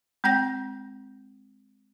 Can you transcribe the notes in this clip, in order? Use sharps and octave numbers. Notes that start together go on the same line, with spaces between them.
G#3 C4 G5 G6 A#6